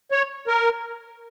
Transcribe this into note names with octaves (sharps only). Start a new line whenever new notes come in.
C#5
A#4